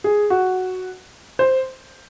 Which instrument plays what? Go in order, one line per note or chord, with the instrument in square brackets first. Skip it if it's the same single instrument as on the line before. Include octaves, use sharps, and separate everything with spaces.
[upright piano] G#4
F#4
C5